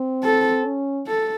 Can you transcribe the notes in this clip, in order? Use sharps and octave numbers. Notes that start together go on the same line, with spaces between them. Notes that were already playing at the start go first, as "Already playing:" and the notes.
Already playing: C4
A4
C#4
A4